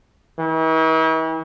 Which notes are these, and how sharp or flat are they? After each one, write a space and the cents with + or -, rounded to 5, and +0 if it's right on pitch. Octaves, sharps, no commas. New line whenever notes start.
E3 -45